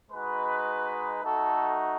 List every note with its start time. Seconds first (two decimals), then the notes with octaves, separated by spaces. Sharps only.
0.11 G#3 D#4 F#4 B4
1.22 A3 D#4 F#4 A4